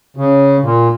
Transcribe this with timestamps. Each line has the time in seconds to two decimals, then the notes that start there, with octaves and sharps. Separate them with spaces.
0.17 C#3
0.63 A#2